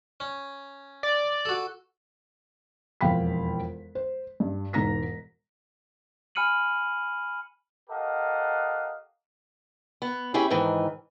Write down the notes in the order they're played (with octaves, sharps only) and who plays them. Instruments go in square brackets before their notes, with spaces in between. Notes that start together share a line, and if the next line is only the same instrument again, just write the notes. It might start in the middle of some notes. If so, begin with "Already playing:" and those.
[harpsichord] C#4
[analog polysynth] D5
[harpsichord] F#4 A4
[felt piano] E1 F2 F5 G5 B5 B6
C5
G2
E1 G#2 A#5 A#6 B6
[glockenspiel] G#5 B5 F6 C#7 D#7 F#7
[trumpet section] G4 A4 A#4 D#5 F5 F#5
[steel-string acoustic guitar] B3
C#4 E4 G4 G#4
G#2 D#3 E3